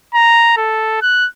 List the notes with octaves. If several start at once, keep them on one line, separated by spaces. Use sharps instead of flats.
A#5
A4
F#6